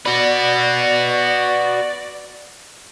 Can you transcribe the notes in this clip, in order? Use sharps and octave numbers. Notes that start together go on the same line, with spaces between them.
F#4 B4 D5